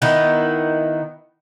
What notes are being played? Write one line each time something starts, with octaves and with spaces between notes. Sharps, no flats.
D#3 B3 E4